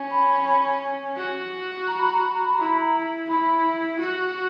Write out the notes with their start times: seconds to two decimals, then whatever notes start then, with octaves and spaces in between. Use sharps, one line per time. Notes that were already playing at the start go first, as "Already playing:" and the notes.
Already playing: C#4
0.11 B5
1.17 F#4
1.88 A#5
1.99 B5
2.10 A#5
2.21 B5
2.32 A#5
2.44 B5
2.54 E4 A#5
2.66 B5
2.78 A#5
3.29 E4 B5
3.99 F#4